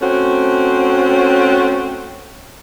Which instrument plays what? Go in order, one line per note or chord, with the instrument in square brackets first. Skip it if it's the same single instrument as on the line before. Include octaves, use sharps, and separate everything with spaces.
[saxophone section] A3 C4 C#4 F#4